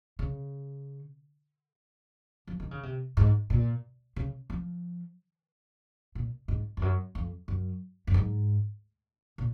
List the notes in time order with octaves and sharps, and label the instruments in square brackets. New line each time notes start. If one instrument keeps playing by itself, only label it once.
[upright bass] C#3
F3
D#3
C#3
C3
G#2
A#2
C#3
F3
A#2
G#2
F2
F#2
F2
F#2
F#2
G#2
A#2